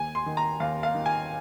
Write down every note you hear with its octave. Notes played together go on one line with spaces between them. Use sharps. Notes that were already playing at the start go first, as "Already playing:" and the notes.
Already playing: D#2 G#5
C6
D#3
A#5
D#2 F5
F5
D#3
G#5